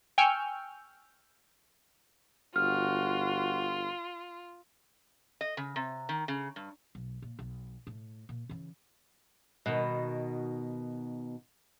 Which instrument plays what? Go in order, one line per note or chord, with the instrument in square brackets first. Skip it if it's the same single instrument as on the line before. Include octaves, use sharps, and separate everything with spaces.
[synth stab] G5 G#5 C#6 E6 F6 G6
[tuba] G1 [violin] F4 [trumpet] F#4 [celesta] F6
[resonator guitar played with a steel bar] D#5
C#3
C3
D#3
C#3
G2
[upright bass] B1
A#2
B1
A2
A#2
C#3 E3
[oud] B2 D#3